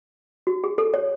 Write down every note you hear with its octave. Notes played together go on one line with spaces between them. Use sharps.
F#4
G#4
A4
C#5